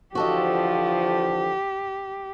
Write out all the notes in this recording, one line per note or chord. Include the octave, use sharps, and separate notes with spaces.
D3 E3 F3 F#4 G4 A4 D#5